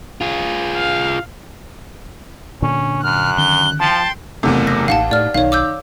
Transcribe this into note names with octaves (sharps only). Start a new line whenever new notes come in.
F4 G#4
F5
A#2 D3 C#4 D4
F#2 F6 F#6
D3 D#3 C#4 G7
F3 G5 A5 C6
F#1 E2 C3 A3
A#6
A1 D#2 F5 F#5 A5
A2 D5 F6
B1 D#3 C#5 F5
D6 E6 G6